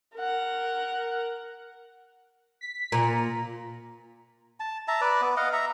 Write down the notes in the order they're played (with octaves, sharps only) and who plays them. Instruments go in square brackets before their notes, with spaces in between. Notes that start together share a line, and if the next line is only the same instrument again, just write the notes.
[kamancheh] A#4 F#5
[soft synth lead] B6
[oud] A#2 [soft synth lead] A#5
[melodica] A5
E5 A5 A#5
B4 D5
B3
D#5 F5 F#5
E5 A#5